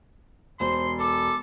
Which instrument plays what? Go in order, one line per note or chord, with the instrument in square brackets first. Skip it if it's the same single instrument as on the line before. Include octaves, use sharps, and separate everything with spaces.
[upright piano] E1 [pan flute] C5 [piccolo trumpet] C6
[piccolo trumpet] A4 [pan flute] D6